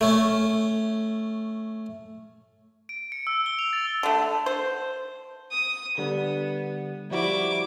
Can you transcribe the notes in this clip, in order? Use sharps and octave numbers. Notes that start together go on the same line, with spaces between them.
A3 C#4
D7
C#7
E6
G7
F7
A6
D3 A3
C5
D#6
D3 G3 B3
F3 G3 E4 F#4 D6